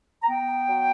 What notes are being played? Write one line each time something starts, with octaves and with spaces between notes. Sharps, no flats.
A#5
B3 G5
F#3